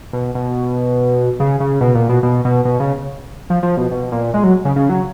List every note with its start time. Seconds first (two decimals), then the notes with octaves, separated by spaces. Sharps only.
0.13 B2
0.35 B2
1.40 C#3
1.60 C#3
1.81 B2
1.95 A#2
2.09 B2
2.23 B2
2.45 B2
2.65 B2
2.80 C#3
3.50 F3
3.63 F3
3.77 B2
3.91 B2
4.12 A#2
4.34 G#3
4.44 F#3
4.65 C#3
4.76 C#3
4.89 F#3